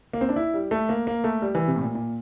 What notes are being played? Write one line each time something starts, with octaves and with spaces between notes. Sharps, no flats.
A#3
C4
D4
E4
G3
A3
A#3
A#3
A3
G3
E3
C3
A2
A#2
A#2